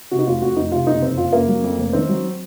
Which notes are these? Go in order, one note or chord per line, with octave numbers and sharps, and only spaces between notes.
C3 F#4
D#4
F1 F4
F2 F#4
F1 D#4
C3 F4
F#1 D#4
F2 C4
F#1 F4
C#3 A#3
F#3
F2
F1
D#3 C4
F#3